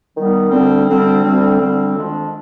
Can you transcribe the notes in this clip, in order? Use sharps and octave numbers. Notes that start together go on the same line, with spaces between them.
D#3 G3 B3
D2 D3 G3 C4
D2 D3 G3 C4
D2 D3 G3 C4
D2 D3 G3 C4
F2 D#3 G#3 D4